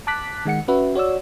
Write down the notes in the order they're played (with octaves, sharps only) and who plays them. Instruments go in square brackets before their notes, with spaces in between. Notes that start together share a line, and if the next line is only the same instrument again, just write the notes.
[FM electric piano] A5 D6 F#6 B6
D#3 G#3 F#5 C#7
C#4 F#4 B4 E5
F#4 C#5 D5 E6